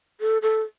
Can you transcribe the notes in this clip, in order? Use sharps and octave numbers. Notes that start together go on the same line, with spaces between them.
A4
A4